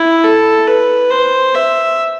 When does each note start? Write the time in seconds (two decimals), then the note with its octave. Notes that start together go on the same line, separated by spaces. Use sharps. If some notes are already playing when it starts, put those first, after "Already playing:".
Already playing: E4
0.24 A4
0.67 B4
1.10 C5
1.55 E5